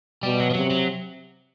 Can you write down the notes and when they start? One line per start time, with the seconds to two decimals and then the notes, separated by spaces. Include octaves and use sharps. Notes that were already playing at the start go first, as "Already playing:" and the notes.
0.23 B2 G3
0.40 F#3
0.50 F3
0.54 C3 F#3
0.71 F#3